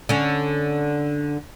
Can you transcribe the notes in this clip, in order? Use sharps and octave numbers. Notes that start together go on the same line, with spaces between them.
D3 C#4